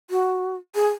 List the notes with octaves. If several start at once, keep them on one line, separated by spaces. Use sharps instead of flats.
F#4
G#4